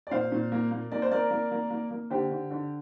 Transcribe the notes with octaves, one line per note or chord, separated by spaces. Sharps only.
D5
A#2 C5 F5
A#2
A#3
A#3
A#3 D5
C5
A#3 A#4 D5
A#3
A#3
A#3
A#3
D3 G4 C5
D3
D3